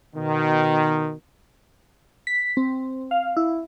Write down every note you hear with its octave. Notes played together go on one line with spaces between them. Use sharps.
B2 D#3
B6
C4
F5
E4